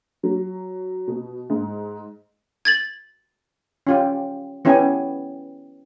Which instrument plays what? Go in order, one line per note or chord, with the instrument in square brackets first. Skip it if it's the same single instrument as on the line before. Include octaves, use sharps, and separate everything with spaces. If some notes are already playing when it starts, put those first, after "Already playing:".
[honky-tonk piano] F#3
B2
G#2
[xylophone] G#6 A6 F#7
[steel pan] C#4 F4 G4
B3 C#4 E4 G4 G#5